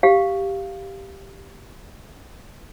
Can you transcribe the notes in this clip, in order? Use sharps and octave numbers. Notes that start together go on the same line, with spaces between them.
G4 F5